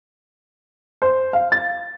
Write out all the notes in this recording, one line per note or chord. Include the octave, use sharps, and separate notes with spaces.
C5
F5
A6